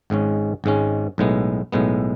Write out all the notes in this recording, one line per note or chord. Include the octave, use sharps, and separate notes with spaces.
G#1 G#2 G#3 C#4
G#1 G#2 G#3 C#4
B1 A2 G#3 B3
B1 A2 G#3 B3